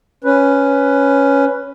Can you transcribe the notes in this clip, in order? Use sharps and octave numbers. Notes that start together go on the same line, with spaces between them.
C#4 B4